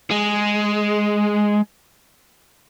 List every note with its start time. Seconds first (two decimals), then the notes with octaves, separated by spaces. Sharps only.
0.11 G#3